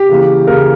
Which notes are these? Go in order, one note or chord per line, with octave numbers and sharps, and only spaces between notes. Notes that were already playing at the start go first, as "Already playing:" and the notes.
Already playing: G4
C#3 E3 A#3
C#3 E3 A#3 A#4